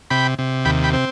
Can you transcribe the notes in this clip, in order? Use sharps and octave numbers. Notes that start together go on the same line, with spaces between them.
C3 G5 B5
C3
D#2 G5 B5
G5 B5
C4